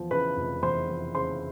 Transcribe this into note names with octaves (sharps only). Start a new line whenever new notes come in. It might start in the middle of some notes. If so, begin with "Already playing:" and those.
Already playing: E2 F3
C#3 B4 B5
F1
E2 C5 C6
F3
C#3 C5 C6